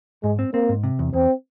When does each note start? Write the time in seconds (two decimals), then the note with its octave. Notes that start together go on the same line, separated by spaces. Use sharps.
0.23 G#2 G#3
0.39 C4
0.53 A#3 C4
0.69 G#2
0.83 C3
0.99 E2
1.13 E2 C4